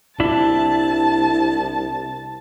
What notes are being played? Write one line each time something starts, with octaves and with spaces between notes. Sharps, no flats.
C2 D4 E4 A5